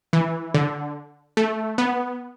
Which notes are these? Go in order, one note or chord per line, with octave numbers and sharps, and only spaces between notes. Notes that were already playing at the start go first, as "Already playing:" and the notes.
E3
D3
A3
B3